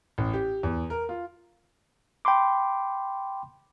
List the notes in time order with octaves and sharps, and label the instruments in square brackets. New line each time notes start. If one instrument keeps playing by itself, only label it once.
[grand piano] A1
G4
E2
A#4
F4
[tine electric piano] G5 B5 C6 D6